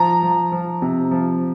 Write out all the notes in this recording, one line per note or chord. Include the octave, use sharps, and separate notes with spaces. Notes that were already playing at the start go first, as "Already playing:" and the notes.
Already playing: F3 A#5
F3
F3
C3
F3